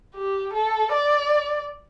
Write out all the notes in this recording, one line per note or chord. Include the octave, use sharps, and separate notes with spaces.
G4
A4
D5